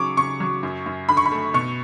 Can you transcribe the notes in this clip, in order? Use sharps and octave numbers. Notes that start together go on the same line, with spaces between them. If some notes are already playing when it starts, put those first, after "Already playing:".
Already playing: C#3 F#3 C#6 D6
C#3 C#6
F#3
F#2
F#2
D3 B5
C#6
B5
A3
B2 C#6